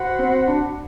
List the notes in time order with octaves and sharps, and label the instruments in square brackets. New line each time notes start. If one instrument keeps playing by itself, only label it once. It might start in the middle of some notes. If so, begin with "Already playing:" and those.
Already playing: [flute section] F#4 C5 F#5 B5
[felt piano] C4
D4